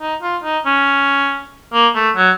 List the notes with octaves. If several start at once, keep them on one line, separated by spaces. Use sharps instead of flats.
D#4
F4
D#4
C#4
A#3
A3
F#3